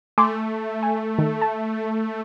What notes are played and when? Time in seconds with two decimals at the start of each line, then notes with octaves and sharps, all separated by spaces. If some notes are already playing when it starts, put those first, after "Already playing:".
0.18 A3 G#5 C6 D6
0.83 G#5
1.19 D#3
1.41 A5